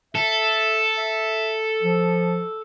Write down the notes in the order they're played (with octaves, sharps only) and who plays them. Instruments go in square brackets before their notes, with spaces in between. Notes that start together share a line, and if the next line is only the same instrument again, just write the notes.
[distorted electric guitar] A4 [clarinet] E5
[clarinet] E5
F3